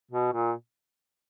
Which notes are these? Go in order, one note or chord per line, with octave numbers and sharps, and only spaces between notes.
B2
A#2